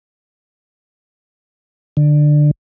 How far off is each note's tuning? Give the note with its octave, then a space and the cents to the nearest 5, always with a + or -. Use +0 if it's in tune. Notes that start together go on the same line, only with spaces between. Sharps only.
D3 +15